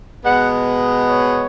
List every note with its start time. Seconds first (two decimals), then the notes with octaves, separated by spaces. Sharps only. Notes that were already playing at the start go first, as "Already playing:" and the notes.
0.24 B2 G#3 B3 F#5
1.06 C#5